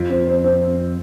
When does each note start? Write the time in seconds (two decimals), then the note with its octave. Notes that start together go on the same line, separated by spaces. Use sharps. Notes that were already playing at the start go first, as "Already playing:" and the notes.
Already playing: F2 F4
0.10 C4
0.27 C5
0.44 C4